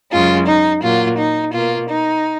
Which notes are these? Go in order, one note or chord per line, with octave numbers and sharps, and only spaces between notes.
F#2 C#3 G#3 F4
D#4
A#2 F#3 A#3 F4
D#4
B2 A#3 F4
D#4